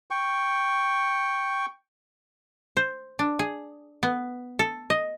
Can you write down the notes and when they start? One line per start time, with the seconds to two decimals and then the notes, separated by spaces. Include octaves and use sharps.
0.11 G5 C#6
2.77 C5
3.19 D4
3.39 G#4
4.03 B3
4.59 A4
4.90 D#5